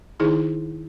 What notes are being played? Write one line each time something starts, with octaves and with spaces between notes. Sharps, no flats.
D#3 D#4 E4 G#4 C6